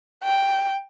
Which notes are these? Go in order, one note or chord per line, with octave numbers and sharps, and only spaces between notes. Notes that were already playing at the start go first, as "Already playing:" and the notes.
G5